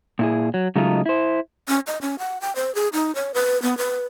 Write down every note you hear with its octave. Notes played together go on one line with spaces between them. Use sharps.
A#2 E4 G#4
F#3
C#3 F#3 G#3 A3 D#4 F4
E4 C5
C#4
D#5
C#4
F#5
G5
C5
G#4
D#4
C#5
B4
B3
B4